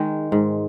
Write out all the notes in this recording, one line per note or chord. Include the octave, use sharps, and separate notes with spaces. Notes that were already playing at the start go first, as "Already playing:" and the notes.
Already playing: D#3 G#3
G#2